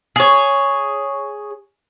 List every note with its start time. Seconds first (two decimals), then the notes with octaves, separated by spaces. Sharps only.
0.16 G#4 C#5